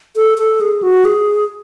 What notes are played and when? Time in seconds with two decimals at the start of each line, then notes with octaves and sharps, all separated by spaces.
0.16 A4
0.38 A4
0.61 G#4
0.83 F#4
1.05 G#4